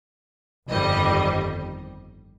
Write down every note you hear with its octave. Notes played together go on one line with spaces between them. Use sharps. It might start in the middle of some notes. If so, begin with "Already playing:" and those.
G1 F2 D#3 G3 D#5